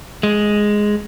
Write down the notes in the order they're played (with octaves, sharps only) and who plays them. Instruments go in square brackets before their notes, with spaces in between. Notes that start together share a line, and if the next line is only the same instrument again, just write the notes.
[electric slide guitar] G#3